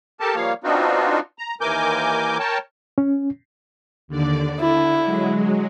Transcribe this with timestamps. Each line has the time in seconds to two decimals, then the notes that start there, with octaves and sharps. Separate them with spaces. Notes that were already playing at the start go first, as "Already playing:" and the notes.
0.20 G4 A4 A#4 A5
0.35 F3 G3 A#3 C#5 F5
0.64 B3 C4 D4 D#4 F4 F#4
1.39 A#5
1.61 D#2 E3 A#4 G#5 D6 G6
2.39 A#4 C#5 G5 A5
2.98 C#4
4.08 D#2 D3 D5
4.60 D3 E4
5.05 F#3 G#3